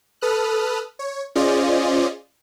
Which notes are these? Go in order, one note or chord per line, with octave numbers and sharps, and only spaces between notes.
A4 B4 D#6 F6 F#6
C#5
C#4 F4 G#4 C5 D5 D#5